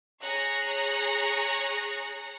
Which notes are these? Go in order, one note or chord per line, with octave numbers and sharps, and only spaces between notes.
G#4 C#5 A#5 F#6 A#6 C#7